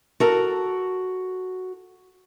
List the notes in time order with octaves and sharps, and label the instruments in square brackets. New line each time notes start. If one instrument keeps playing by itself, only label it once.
[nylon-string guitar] F#4 A4 A#4